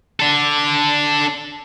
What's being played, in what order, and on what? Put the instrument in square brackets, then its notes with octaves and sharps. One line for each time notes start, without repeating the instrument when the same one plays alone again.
[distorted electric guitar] D4 A4